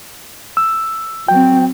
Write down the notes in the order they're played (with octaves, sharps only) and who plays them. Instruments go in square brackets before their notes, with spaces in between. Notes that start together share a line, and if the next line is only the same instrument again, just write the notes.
[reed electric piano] E6
[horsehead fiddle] F#3 C4 [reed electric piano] G5